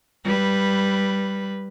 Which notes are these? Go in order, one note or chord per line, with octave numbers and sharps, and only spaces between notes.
G3 B4